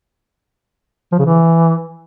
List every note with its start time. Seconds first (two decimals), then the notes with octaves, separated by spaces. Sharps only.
1.12 F3
1.19 C#3
1.26 E3